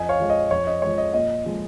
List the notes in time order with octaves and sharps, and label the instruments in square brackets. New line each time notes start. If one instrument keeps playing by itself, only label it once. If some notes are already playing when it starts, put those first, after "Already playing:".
Already playing: [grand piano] F2 D#5 G#5
C#5 F5
F3 G#3
D#5
F2 C#5
D#5
F3 G#3 C#5
D#5
A#2 D#5
F3 G#3